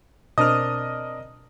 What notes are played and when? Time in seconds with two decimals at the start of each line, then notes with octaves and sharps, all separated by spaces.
0.38 B2 C4 D4 A#4 D#5 D#6 F6